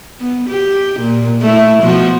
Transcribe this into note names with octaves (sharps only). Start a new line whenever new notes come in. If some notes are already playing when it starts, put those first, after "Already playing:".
B3
G4
A#2
A3 E4
B2 F3 F#4